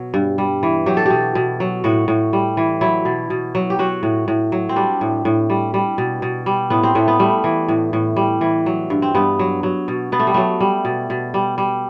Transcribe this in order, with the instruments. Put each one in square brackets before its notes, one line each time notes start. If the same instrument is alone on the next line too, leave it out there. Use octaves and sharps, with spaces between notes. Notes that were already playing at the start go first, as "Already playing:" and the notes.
Already playing: [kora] B2 F#3
G2
G3
E3
F#3 G4
A4
B2 G4
B2
F#3
A2 F#4
A2
G3
E3
F#3 E4
B2
B2
F#3
G4
F#3 F#4
A2
A2
F#3
C4
G3 D4
A2
A2
G3
G3
B2
B2
G3
A2 B3
C4
A2 A3
B3
G3 A3
E3
A2
A2
G3
E3
F#3
G2
C4
G2 B3
F#3
F#3
B2
B2 B3
A3
G3
F#3 A3
G3
B2
B2
G3
G3